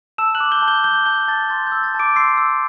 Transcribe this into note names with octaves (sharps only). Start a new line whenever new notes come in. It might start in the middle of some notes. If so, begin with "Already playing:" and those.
A5 E6 E7
F#6 F#7
D6
G6 G7
A5
G6 G7
D6 G6 G7
A5 G6 G7
A5 A6
C6 A6
G6
E6
A6
A5
D6 D7
C6 E6 C7
E6